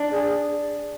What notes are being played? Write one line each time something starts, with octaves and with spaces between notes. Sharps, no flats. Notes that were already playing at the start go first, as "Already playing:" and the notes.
Already playing: D4
G#4